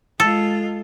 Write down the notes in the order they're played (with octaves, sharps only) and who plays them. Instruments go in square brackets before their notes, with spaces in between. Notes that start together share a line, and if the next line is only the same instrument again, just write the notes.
[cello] G#3 F4 [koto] A4